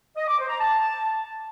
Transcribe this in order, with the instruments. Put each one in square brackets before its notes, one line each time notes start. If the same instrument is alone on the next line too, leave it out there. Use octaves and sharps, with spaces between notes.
[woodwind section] D#5
D6
C5
A#5
A5